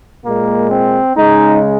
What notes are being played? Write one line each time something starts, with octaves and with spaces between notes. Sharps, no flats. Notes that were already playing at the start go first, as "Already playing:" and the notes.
A#2 G#3 A#3
C4
C#3 G#3 D#4